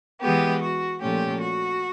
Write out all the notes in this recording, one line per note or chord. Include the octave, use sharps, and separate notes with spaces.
E3 G#3 B3 G4
F#4
A#2 F3 A3 C#4 G4
F#4